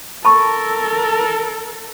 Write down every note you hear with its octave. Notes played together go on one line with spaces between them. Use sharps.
A4 A#4 A5 B5 C#6